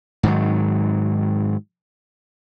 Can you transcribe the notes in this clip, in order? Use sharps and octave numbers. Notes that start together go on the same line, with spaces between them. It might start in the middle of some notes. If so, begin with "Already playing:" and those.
G#2 D#3 F#3